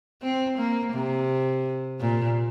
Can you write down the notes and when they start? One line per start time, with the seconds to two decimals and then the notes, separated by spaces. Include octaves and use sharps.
0.22 C4
0.58 A#3
0.93 C3
2.00 A#2